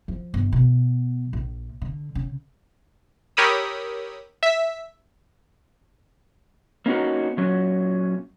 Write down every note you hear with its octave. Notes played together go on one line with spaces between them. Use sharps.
F3
G1
B2
A#1
D3
C#3
G4 A#4 C#5 B5 D#6 E6
E5
A#3 C#4 D#4 E4 F#4 B4
A#2 F#3 C#4